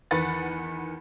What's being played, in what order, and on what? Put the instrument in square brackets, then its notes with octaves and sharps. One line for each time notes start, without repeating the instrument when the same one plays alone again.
[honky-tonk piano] E2 D#3 B4 F#5 A6